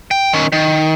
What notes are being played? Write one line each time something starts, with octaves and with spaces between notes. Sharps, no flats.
G5
D#3 C#4
D#3